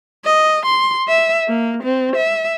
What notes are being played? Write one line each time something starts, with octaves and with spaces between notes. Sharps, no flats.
D#5
C6
E5
A#3
C4
E5